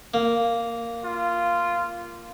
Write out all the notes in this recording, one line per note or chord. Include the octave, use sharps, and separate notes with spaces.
A#3
F4